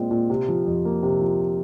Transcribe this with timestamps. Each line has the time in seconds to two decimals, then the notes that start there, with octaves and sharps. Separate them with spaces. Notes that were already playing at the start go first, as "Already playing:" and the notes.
Already playing: A#2 G#3 C4
0.11 A#2
0.30 C3
0.48 F3
0.66 F2
0.85 A#3
1.03 C3
1.21 F3